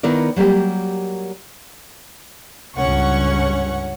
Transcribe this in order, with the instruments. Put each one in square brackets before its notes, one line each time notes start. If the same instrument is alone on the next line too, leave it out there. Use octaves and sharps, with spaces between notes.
[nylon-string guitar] D#3 B3 E4 A#4 D5
F#3 G3 A#3 G4
[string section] C#2 G2 C#4 F#5 C#6